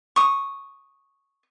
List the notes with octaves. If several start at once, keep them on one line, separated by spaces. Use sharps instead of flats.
C#6 D#6